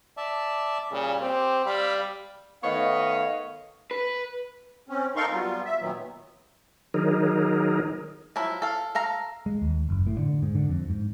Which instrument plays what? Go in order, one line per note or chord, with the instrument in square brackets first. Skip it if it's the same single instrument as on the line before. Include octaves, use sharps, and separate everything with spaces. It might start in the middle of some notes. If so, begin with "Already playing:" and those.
[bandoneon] D5 E5 A5
[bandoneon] A#2 G3 [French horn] C#3
[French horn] C4 [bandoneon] G4
[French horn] G3 [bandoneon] F5 B5 E6
[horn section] D#3 A3 B3 C#5 D#5 F5
[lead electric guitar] B4
[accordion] C4 C#4
D#4 A4 A#4 F5 C6 C#6
F#3 G3 B3 F4
E5
A#2 D#3 F#3 B3
[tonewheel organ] D#3 F#3 D#4 G#4 A#4
[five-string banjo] F3 F#3 E4
A4 F5
A4 F5 A#5
[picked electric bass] G#3
D#2
F#1
A2
D3
G#2
D3
F2
G#2